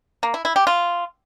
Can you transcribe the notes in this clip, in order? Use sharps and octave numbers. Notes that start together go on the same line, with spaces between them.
A#3
E4
E4
G4
F4